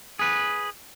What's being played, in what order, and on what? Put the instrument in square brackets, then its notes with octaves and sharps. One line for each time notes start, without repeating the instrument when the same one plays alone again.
[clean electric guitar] G#4 B4